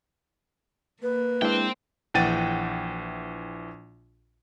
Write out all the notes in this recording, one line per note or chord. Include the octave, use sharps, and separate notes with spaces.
A#3 B4
G#3 D4 E4 C5 G5
A#1 E3 F#5 G5 A6 D#7